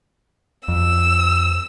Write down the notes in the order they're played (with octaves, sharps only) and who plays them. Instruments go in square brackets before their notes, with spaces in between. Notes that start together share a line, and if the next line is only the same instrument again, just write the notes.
[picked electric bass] F2 [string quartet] E6